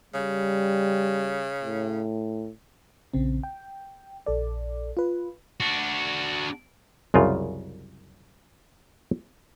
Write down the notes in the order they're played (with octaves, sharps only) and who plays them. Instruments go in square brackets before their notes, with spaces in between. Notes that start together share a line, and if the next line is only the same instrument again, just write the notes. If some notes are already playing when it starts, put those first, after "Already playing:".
[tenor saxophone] C#3 [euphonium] G3
[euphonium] A2
[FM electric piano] A#1 C#3 C4
G5
A#1 A4 D5
F4 B4
[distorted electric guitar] D4 F#4
[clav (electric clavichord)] C2 F#2 C#3 F4